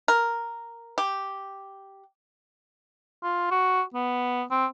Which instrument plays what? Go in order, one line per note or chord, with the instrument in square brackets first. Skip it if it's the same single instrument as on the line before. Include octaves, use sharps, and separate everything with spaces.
[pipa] A#4
G4
[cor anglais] F4
F#4
B3
C4